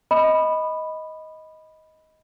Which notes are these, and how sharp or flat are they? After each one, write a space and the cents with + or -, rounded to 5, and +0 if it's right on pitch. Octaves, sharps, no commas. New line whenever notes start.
D#5 +15 B5 +0 D#6 -35